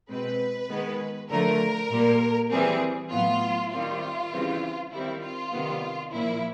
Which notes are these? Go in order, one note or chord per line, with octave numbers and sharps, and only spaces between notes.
B2 G#3 C4 B4
D#3 G#3 B3
D3 F3 A3 A#4
A#2 G3 A#3
E3 G3 C4 G#4
A2 F#3 B3 F4
D#3 G3 C4 F4
C#3 E3 G3 C4
D#3 G3 C4 E4
F4
C3 D#3 G3 B3
A#2 F3 A#3 E4